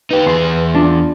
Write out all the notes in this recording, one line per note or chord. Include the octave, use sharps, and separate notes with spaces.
D#4 G4 B4
E2 G#4 C6
D4 F4